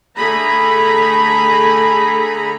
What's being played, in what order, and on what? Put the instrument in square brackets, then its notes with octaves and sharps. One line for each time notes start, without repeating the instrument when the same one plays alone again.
[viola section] D3 A3 G#4 A#5 B5